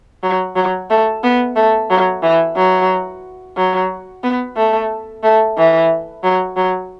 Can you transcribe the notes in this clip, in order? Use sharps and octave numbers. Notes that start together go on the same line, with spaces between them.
F#3
F#3
A3
B3
A3
F#3
E3
F#3
F#3
B3
A3
A3
E3
F#3
F#3